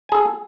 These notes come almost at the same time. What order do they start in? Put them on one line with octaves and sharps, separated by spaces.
G#5 G#4 A4